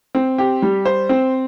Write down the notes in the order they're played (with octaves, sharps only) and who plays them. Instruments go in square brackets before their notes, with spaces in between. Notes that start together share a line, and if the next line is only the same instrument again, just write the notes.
[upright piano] C4
G4
G3
C5
C4